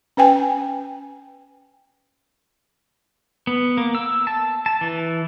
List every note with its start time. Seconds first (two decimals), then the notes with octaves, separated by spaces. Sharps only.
0.17 C#4 B4 G5 G#5
3.47 B3
3.77 A#3
3.95 E6
4.27 A5
4.66 A5
4.81 E3